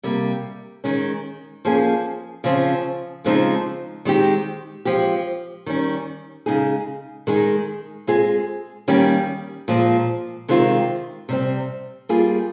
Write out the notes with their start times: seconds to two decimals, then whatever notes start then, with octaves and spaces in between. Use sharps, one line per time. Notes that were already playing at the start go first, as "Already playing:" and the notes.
0.03 C3 G3 A#3
0.84 D#3 G#3 C#4
1.65 F3 A#3 C#4 G#4
2.44 C#3 F3 C4
3.24 C#3 F3 G#3 C4 D#4
4.05 D#3 G#3 C4 D#4 G4
4.85 F3 G#3 C4 G4
5.66 D#3 G3 C#4
6.46 C#3 G#3 D#4 G#4
7.27 D#3 G#3 D#4 G#4
8.07 G#3 C4 F4 G#4
8.88 D#3 G3 A#3 C#4 G4
9.68 A#2 F3 G#3
10.48 C3 D#3 G#3 C4 F4
11.29 C3 G3 C4
12.09 G3 A#3 F4 G#4